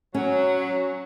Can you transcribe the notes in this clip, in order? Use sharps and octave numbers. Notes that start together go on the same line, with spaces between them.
F#3 C#4